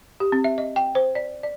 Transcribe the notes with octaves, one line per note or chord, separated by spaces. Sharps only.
G4
C4
E5
D#5
G5
C5
D5
D5